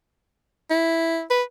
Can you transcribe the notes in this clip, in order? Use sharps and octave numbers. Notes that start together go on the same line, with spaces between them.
E4
B4